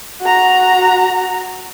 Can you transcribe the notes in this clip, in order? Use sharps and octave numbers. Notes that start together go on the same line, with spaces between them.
F#4 A#5